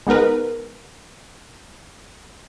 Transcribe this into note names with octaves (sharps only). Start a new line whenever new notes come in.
G#3 B3 D#4 A#4 B4